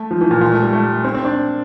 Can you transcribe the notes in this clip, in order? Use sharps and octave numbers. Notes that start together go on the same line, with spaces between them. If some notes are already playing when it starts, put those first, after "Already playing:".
Already playing: A3
F3
E3
A#2
A#2
A3
G3
A3
C4
C4
D4